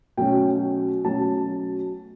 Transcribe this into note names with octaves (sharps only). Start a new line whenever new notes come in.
B2 F#3 A3 C#4 G5
B2 F#3 A3 C#4 A5